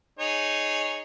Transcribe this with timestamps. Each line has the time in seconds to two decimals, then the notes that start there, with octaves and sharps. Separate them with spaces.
0.19 D#4 G#4 C#5